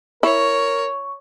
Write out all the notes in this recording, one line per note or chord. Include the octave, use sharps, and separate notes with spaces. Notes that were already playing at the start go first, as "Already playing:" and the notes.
E4 A#4 C#5 C#6